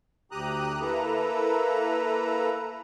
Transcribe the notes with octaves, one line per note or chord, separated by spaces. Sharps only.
D2 G4 A#5 D#6 F#6
A#3 E4 A4 B4 A#5